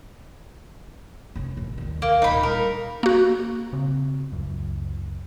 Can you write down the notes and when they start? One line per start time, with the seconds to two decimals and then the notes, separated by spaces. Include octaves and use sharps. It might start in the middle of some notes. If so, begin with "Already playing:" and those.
1.36 F1 C#4
1.57 A1 B2
1.78 D#2 D3
2.02 A#3
2.22 D1 A#2 D#4 B5
2.43 G3 A#4
3.03 A#3 F#4
3.73 C#3 C4
4.32 C#2 F#2